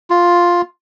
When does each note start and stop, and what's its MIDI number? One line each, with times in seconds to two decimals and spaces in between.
0.10 0.62 65